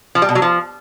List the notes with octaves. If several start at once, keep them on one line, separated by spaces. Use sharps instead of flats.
F3
G3
B2
F#3
F3